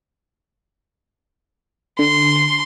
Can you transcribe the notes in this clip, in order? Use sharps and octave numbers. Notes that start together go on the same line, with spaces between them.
D3 C6